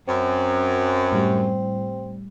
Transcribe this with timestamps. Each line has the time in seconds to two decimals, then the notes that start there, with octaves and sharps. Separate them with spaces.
0.08 F#2 C4
1.12 A2 G3